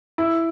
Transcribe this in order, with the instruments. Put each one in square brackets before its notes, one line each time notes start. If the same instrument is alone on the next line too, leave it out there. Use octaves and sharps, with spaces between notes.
[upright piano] E4